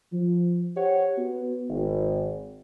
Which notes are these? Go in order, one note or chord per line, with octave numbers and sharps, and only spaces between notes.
F3
G4 C5 C#5 F#5
B3 F#4
G#1